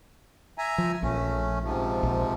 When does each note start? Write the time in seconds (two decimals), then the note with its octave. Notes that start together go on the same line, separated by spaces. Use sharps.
0.58 E5 G#5 A#5
0.78 F3
1.03 A#1 A3 C#4
1.63 G#2 C3 F3
2.03 A#1